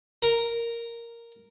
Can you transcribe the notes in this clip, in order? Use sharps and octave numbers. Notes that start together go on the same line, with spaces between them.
A#4